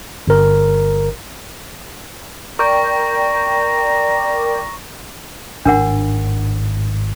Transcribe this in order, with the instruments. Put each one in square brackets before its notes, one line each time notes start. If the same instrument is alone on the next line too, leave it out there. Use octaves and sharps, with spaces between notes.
[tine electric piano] G1 A#4
[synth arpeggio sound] A#4 D5 G5 [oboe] A#5 [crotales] C#6
[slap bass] G#1 A2 [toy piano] D4 A#4 F#5